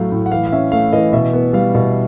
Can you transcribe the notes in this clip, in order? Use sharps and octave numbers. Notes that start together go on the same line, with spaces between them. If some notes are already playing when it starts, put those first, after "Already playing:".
Already playing: A2 F#3 A3 F5
A2
F#5
E3 F5
F5
C#4 E5
A3 F5
E3 D#5
B2 E5
B3
G3 F5
B2